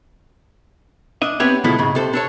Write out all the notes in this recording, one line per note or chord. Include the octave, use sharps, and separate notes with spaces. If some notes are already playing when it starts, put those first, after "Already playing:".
D4 D#5 E5
B3 C4 D4 G4 C#5 E5
D2 B2 F3 G#3 A3 E4
C#2 G#2 C#3
C3 A4 C5
D4 A4 C#5